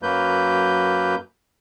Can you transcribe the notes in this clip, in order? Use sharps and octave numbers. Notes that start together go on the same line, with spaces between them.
F#2 F#3 A#3 B4 G6